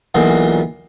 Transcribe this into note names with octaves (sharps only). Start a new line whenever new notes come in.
B1 E2 A#2